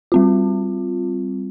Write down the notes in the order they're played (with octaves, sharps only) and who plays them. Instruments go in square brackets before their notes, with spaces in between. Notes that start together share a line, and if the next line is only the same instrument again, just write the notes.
[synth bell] G3 C4 F4